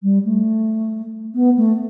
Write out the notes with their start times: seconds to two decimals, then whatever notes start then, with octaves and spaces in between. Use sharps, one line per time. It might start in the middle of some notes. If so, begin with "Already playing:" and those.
0.03 G3
0.24 A3
1.34 B3
1.57 A3